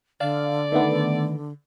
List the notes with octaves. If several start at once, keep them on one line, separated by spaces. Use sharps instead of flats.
D3 D5 F5
D#3 A3 B3